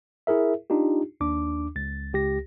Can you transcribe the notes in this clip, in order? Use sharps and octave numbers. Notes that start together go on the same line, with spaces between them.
E4 G#4 A#4 E5
D4 D#4 F4 G4
D#2 D4 D6
C#2 A6
C#2 G4 A#6